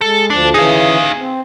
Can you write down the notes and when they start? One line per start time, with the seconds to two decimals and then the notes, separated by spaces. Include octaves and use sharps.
0.01 G#3 A4
0.30 D2 F3 D4 A5
0.54 C#3 E3 D#4 G#4 F5
1.18 C4